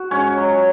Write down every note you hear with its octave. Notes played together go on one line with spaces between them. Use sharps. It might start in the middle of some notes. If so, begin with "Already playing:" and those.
Already playing: F#4
G#2 C#4 C#5
F#3